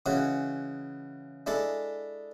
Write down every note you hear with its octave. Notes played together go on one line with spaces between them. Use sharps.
C#3 E3 G#3 F#4
G#3 D4 E4 A4